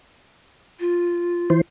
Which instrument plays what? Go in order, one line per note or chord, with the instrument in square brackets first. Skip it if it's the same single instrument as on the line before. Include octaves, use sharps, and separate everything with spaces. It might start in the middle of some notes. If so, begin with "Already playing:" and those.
[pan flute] F4
[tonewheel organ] E3 C5